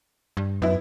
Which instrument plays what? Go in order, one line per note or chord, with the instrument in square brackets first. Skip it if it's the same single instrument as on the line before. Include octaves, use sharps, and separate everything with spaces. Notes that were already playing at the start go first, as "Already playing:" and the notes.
[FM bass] G2
[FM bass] F#2 [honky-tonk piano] B3 E4